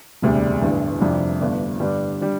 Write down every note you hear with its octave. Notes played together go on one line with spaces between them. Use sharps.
E1 D2 C3 G3 D4
A1 G2 D3
F2 C3 G3 D4
G1 G2 D3 A3 D4
G2 D3 G3 D4
D3 G3